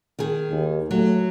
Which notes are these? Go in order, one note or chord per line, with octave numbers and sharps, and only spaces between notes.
D#3 G#4
D#2
F#3 A3